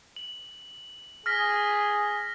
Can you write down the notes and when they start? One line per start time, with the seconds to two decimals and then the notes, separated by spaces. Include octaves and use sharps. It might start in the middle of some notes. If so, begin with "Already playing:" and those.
0.16 F#7
1.26 G#4 F6 A#6 B6